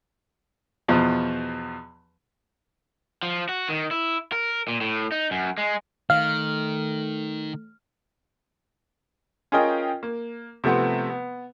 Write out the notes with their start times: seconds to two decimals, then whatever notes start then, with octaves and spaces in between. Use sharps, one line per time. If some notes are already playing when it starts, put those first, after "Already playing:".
0.88 E2 B2 F3
3.23 F3
3.49 F#4
3.69 D#3
3.91 E4
4.32 A#4
4.68 A#2
4.81 A2
5.12 D#4
5.31 F#2
5.58 G#3
6.10 D#3 A3 F5 F6
9.52 C#4 F4 G#4 A#4 D#5 G5
10.03 A#3
10.64 C3 F3 A3 B3 C4
11.09 B3